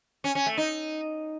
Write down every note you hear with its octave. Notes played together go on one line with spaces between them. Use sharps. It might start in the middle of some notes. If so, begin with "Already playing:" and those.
C#4
C#4
A3
D#4